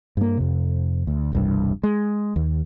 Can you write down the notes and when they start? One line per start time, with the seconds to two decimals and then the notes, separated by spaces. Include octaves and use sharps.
0.17 G2 A#3
0.37 F2 C3
1.07 D2
1.33 E1 C2 G2
1.83 G#3
2.36 D#2